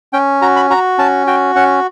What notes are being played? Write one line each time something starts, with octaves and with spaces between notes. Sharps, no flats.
C#4 G5
F#4 A#5
B5
F#4 A#5
C#4 A5
F#4 G5
C#4 F#5